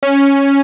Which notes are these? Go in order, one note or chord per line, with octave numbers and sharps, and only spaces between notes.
C#4